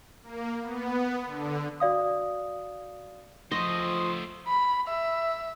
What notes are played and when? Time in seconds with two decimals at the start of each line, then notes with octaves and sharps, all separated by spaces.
0.23 A#3
0.61 B3
1.24 D3
1.80 F#4 D5 F5 D#6
3.52 F3 A3 C5 D#5 C6 D#6
4.48 B5
4.88 E5